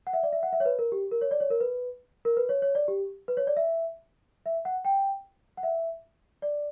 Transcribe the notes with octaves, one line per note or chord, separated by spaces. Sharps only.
F#5
E5
D5
E5
F#5
E5
C#5
B4
A#4
G4
A#4
C#5
D5
C#5
A#4
B4
A#4
B4
C#5
C#5
D5
G4
B4
C#5
D5
E5
E5
F#5
G5
F#5
E5
D5